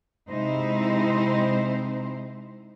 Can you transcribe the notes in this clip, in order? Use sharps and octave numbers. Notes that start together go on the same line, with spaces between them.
C3 G#3 C4 D#4 E4 C5